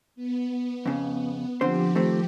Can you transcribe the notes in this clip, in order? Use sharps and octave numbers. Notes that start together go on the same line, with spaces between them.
B3
F2 C#3
D3 F3 C4 G4 C5
D#3 A3 C4